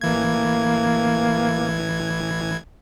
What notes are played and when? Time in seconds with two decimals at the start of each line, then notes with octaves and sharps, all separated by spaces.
0.01 A1 E3 A#3 G#6